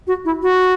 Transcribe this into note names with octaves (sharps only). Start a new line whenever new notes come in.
F#4
E4
F#4